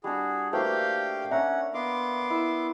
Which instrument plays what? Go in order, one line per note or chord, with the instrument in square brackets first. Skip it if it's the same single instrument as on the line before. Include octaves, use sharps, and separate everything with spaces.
[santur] G3 D4 [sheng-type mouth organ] F#4 G#4
[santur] A3 A#3 [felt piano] F#4 B4 C5 [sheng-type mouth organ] G4 F5 G5
[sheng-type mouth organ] C#4 F#5 [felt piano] E5 [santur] A#5
[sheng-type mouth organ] B3 C6 D6 [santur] F5
[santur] E4 E6